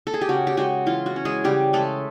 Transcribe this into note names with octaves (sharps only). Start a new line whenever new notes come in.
A4
G#4
G4
C#3 F#4
G4
G#3 F#4
E3 F4
F#4
C#4
G#3 G#4
C#3 G3 G4
G#3 A3 A4